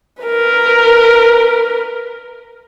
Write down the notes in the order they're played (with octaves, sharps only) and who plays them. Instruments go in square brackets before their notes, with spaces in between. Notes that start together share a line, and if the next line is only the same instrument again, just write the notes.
[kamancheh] A#4 B4